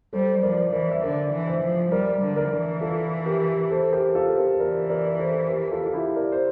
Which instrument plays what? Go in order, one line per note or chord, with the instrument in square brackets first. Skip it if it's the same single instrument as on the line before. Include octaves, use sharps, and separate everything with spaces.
[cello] G3 [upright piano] A4 C5
[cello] F3 [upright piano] A#4 D5
[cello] E3 [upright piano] A#4 D5
[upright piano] E5
[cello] D3 [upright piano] A#4 D5
[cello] E3
[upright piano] C5 E5
[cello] F3
[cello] G3 [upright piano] A#4 D5
[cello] D3
[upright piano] A#4 D5
[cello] E3
[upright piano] F4 A4
G4 A#4
A4 C5
G4 A#4
F4 A4
G4 A#4
[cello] E3 [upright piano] A#4 D5
[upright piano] A#4 D5
A4 C5
G4 A#4
F4 A4
F4
E4 G4
A#4 D5
C5